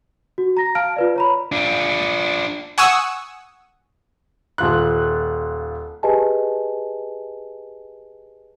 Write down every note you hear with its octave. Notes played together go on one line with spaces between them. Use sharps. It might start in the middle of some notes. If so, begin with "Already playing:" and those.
F#4
A#5 A#6
F5 A5 F6 D7
F4 B4 D5
C#5 A#5 B5
D4 F4
F#5 G#5 C#6 D#6 E6
D#1 F4 F#6
G4 G#4 B4 D#5 G#5 A5